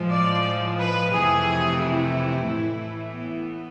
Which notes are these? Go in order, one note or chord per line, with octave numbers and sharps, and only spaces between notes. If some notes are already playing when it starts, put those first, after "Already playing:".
Already playing: A2 F3 G#3
D5
B4
F2 C3 E3 A3 G#4
E4
A2 E3 A3
B3